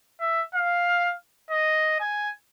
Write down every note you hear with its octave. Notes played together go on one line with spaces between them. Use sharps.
E5
F5
D#5
G#5